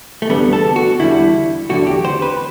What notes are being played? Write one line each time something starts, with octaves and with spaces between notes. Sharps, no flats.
A3
E2 D3 G3 B3
A4
F#4
E2 D3 G3 E4
E2 D3 F#3 A3 F#4
G4
C5
B4